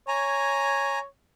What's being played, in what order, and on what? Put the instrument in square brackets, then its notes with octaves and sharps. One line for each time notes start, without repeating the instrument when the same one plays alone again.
[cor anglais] C#5 [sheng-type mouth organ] G#5 A#5